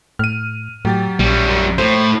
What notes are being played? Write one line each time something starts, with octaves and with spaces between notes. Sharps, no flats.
A2 F6 D#7
A2 F#3 G4 A6
A#1 G3 C#4
F#2
A2 C5